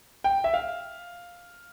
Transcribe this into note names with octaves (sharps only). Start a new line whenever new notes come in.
G5
E5
F5